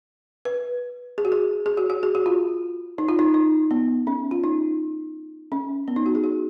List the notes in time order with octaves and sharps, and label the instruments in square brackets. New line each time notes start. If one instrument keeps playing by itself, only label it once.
[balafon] B4
G#4
F#4
G#4
G#4
F#4
F#4
G#4
F#4
F4
D#4
F4
D#4
D#4
B3
C#4
F4
D#4
C#4
B3
D#4
F#4
G#4
F#4